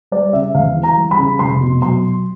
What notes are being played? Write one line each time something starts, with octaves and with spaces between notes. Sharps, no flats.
G3 D5
C#3 E5
E2 F5
E3
A#5
G3
B5
C#3
F1 C6
B2
F#3 C6